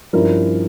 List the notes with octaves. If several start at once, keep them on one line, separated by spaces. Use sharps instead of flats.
G2 F3 C#4 E4 A#4